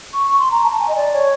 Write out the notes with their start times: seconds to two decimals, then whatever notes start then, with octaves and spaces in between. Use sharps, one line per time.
0.13 C#6
0.26 C#6
0.39 C6
0.51 A#5
0.64 A5
0.79 G#5
0.88 D#5
0.96 D5
1.13 C#5